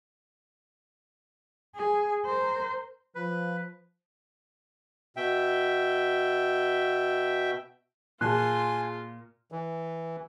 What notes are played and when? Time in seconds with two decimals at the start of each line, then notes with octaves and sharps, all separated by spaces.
1.75 G#4
2.26 A#4 C5
3.15 F3 B4
5.16 B2 E5 G5
8.21 A#2 F4 G#4 G#5 A5 C6 F#6
9.52 E3